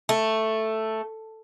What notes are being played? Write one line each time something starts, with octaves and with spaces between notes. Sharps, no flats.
A3